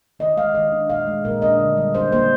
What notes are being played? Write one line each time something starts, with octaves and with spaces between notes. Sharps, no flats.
D#3 D#5
G#3 F5
D#3 D#5
D4
A#2 F5
G#3
A#2 A#4
D4 D#5
D3
G3
D4 C5
A#3 C5